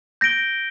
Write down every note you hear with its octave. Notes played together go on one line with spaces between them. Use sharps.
G6 A#6 D7 G7